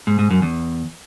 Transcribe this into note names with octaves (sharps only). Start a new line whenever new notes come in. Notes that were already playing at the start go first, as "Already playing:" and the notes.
G#2
G#2
F#2
E2